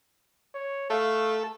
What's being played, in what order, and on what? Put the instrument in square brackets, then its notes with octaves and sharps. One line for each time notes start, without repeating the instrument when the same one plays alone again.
[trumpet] C#5
[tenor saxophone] A3 [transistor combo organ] A4 [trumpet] F5